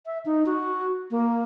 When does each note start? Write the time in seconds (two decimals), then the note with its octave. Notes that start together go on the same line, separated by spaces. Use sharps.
0.06 E5
0.26 D#4
0.46 F#4
1.11 A#3